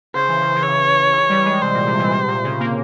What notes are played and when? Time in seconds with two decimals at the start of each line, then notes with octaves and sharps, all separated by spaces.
0.15 C#3 C5
0.29 E3
0.42 C#3
0.55 E3
0.63 C#3 C#5
1.13 E3
1.29 G3
1.45 G#3
1.62 C3 C5
1.74 A#2
1.86 C3
1.99 E3
2.11 C3
2.27 A#2
2.43 C#3
2.60 A#3